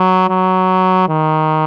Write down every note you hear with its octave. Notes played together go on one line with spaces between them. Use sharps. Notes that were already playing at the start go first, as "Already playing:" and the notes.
Already playing: F#3
F#3
D#3